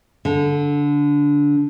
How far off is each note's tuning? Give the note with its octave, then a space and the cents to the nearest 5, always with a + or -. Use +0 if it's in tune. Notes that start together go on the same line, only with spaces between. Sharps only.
D3 -15